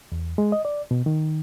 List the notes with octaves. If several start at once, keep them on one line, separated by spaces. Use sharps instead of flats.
E2
G#3
D#5
D5
B2
D#3